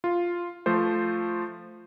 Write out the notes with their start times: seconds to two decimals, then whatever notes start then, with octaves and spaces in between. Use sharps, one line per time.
0.04 F4
0.66 F3 A3 C5